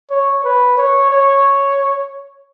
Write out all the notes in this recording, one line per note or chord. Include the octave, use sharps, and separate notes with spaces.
C#5
B4
C#5
C#5